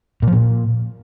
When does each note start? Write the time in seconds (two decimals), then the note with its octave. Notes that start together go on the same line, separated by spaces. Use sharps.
0.22 A#2
0.27 F3
0.32 A#2